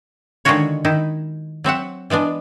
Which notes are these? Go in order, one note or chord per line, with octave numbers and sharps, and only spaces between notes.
D3 D#3 G#3 F4 F#4 C#5
D#3 D#4 E4
F#3 C4 E5 F#5
E3 G#3 B3 D4